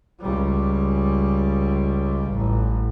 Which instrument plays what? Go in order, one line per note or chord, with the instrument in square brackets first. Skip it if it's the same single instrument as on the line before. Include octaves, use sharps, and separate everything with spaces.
[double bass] C#2 G3
A1